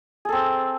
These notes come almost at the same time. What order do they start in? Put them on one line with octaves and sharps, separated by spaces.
G#4 A4 C4 C5